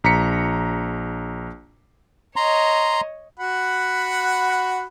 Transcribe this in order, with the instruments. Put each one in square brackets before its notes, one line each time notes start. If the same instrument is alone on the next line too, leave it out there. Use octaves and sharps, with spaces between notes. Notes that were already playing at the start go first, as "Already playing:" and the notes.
[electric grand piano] A#1 A#5 B6 C#7
[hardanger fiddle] C#5 D#5 [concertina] A#5 C6
[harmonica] F#4 F#5 B5